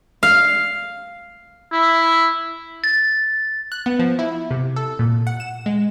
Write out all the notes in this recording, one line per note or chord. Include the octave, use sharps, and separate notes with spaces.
F5
E4
A6
F#6
B3
F3
E4
C3
A4
A#2
F#5
E7
G#3